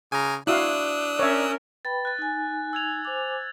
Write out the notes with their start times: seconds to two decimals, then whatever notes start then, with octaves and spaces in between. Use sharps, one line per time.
0.12 C#3 G#5 A#5
0.47 D4 E4 F#4 F5 D#6 E6 F#6
1.19 C#4 A#4 C#5 E5
1.85 B4 G5 B5 A6
2.05 F#6 A6
2.19 D#4 G#5
2.73 E6 G#6 F7
3.05 C5 G#5 D6